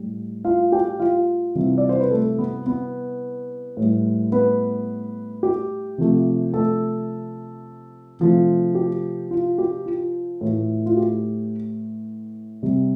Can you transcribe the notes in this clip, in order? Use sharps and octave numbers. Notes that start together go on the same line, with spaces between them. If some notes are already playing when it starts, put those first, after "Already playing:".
Already playing: A2 G3
F4 F5
G4 G5
F4 F5
C3 E3 G3
D5
C5
B4
A3 A4
B3 B4
B3 B4
A2 G3
B3 B4
G4
C3 F3 A3
A3 A4
C3 F3 A3
G4
F4
G4
F4
A2 E3 A3
F4
G4
C3 G3